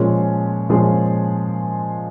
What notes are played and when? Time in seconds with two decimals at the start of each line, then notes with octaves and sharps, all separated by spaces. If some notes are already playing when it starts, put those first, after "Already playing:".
Already playing: A#2 F3 G#3 C#4 G#4
0.69 A#2 F3 G#3 C#4 G#4